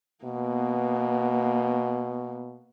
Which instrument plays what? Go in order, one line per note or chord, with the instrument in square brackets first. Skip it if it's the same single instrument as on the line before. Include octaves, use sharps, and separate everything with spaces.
[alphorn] B2 [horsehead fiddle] A#3 B3